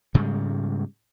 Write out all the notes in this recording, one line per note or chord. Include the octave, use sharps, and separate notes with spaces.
G#2 C#3 G3 G#3